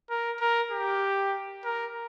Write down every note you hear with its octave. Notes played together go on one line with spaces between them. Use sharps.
A#4
A#4
G4
A#4